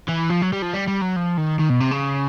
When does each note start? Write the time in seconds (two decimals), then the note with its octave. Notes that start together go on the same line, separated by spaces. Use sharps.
0.09 E3
0.30 F3
0.42 F#3
0.52 G3
0.62 F3
0.73 G3
0.87 G3
1.01 F#3
1.16 F3
1.37 D#3
1.59 D#3
1.70 B2
1.81 C3
1.92 C#3